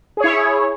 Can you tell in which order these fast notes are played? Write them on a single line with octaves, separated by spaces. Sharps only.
G#4 C#5 E4